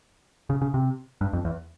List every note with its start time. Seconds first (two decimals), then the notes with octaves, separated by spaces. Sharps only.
0.50 C#3
0.62 C#3
0.74 C3
1.21 G2
1.33 F2
1.45 E2